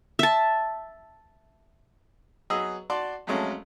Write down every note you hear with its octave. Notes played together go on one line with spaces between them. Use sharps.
E5 A5
F#3 B3 G#4 B4 D#5 E6
F#4 D5 A5 C6 D6
F2 F#3 G#3 A3 C#4